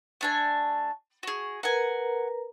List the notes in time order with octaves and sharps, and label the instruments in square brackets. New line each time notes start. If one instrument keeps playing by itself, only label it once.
[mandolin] A3 D4 G#5
[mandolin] F#4 G#4 [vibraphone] C#6
[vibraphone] A#4 B4 A#5 [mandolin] F#5 G#5